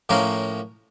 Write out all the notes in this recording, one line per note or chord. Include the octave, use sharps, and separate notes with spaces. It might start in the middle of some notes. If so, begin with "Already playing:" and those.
A2 F3 A#3 C#4 A#4 C5